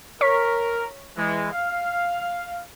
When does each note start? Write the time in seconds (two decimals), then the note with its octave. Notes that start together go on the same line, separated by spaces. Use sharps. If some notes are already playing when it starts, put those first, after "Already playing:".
0.21 A#4 C#5 C#6 B6
1.17 E3 G#3
1.51 F5